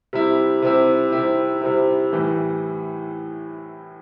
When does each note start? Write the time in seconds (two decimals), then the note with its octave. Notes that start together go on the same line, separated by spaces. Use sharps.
0.13 C3 G3 C4 E4
0.62 C3 G3 C4 E4
1.12 C3 G3 C4 E4
1.62 C3 G3 C4 E4
2.13 A2 E3 G3